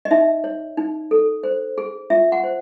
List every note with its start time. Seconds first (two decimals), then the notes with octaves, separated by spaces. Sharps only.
0.05 D#5
0.11 D#4 E5
0.44 C#5
0.77 D#4
1.11 A4
1.43 C5
1.78 G#4
2.10 F4 E5
2.32 F#5
2.44 C5